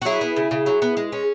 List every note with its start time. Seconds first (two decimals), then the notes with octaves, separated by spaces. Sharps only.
0.02 F#4
0.05 F#3 E4 G#4
0.21 B3
0.36 C#3
0.51 C#3
0.66 F#3
0.82 B3
0.97 G#3
1.12 C#4